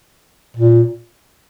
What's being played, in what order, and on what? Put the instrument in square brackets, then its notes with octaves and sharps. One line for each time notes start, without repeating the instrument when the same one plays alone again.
[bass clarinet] A#2